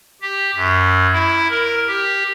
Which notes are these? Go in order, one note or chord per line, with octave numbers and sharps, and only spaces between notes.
G4
F#2
E4
A#4
G4